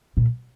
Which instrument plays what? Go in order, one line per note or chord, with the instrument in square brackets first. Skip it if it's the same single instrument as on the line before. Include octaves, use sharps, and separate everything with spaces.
[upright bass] A#2